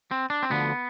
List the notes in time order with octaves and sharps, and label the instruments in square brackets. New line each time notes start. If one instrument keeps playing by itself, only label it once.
[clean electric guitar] C4
D4
C4
D2 D3 F3 B3